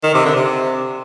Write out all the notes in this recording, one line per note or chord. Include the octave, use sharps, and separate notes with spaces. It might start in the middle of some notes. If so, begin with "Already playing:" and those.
D#3
C3
D3
C3